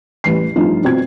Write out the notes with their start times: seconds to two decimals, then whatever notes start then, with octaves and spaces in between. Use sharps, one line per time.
0.24 A1 G3 B4 C7
0.56 G2 F3 A3 D#4 F4
0.84 B2 C4 F4 G#6